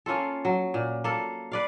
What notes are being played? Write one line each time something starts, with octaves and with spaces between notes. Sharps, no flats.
A#3 C#4 F4 A4
F#3
A#2
A#3 A4
B4 D5 F5